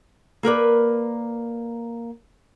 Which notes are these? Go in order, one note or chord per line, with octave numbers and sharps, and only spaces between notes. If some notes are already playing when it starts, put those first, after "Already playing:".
A#3 A#4 B4 D5